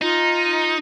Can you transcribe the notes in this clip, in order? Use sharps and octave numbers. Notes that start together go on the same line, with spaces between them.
D#4 F4